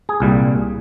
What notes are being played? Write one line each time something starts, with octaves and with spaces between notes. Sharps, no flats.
G#4
C2 A#2 G3